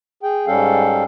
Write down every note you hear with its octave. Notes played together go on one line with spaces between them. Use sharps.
G#4 G5
G#2 G3 C#4 A4 F5 G5